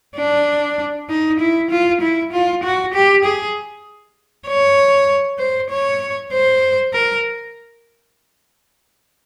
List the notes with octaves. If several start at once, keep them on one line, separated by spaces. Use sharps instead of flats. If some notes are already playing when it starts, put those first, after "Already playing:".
D4
D#4
E4
F4
E4
F4
F#4
G4
G#4
C#5
C5
C#5
C5
A#4